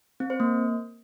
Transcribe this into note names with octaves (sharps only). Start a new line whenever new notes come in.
C4
C5
A#3